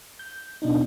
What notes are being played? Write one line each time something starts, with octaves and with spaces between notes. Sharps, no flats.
G6
B2 D4 D#4